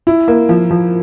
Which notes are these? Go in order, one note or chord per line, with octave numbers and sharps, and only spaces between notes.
E4
A#3
F3
F3